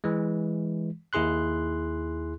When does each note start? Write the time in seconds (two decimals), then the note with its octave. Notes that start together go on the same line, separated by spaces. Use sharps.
0.04 E3 G#3
1.13 D#2 E4 G#4 C6 F#6